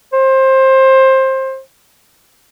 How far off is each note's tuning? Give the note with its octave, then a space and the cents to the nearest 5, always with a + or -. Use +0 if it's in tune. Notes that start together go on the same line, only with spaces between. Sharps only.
C5 +20